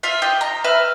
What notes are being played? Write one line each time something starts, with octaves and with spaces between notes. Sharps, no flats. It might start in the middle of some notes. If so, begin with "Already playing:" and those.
F4 E5 F5
G4 D#5
A#5
B4 E5 F6